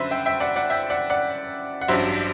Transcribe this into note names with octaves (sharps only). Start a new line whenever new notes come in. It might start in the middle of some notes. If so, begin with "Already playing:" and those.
Already playing: F#2 D3 F#3 B4 C5 E5
E5 G5
E5 G5
D5 F#5
D5 F#5
E5 G5
D5 F#5
D5 F#5
F#5
A1 G2 F#3 C5 E5